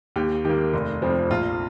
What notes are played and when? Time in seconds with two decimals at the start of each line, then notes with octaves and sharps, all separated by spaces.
0.16 D#2 G4
0.45 D#3 A#3 G4
0.73 F1
1.02 F2 F3 C4
1.30 A#1 F4